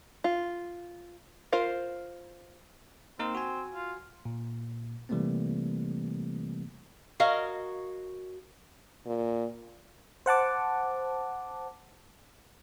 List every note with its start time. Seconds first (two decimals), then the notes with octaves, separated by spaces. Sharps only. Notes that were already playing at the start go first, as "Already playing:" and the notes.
0.24 F4
1.52 F4 A#4 C5 F5
3.19 A#3 C4 D#4 A#4
3.35 F#4 G#5
3.73 F4
4.25 A#2
5.09 C3 E3 G3 A3 A#3 C4
7.20 F#4 A#4 C#5 D#5 F5
9.07 A#2
10.26 C5 F#5 A5 D6